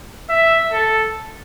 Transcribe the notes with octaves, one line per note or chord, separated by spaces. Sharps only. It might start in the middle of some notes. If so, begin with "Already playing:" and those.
E5
A4